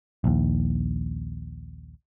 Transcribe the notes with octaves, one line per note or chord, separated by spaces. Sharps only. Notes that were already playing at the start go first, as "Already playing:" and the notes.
A#1 D#2